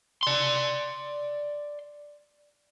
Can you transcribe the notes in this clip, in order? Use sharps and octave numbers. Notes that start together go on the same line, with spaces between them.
D5 C6